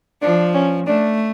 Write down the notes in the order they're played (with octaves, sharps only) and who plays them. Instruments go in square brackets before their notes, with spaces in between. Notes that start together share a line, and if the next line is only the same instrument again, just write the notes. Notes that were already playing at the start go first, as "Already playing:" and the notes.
[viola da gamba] F3 [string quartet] D4
[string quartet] C#4
[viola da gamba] A3 [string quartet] D4